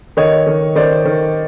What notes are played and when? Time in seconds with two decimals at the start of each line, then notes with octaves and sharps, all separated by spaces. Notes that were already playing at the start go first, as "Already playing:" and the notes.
0.17 D#3 C#5 D#5
0.46 D#3
0.75 D#3 C5 D5
1.05 D#3